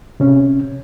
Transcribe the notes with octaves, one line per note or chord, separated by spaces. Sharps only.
C3 C#4